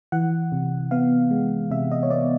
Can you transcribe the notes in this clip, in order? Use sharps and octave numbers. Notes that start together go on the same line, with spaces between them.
E3 F#5
C3
B3 F5
G#3
C3 E5
D#5
C#5
B3 D5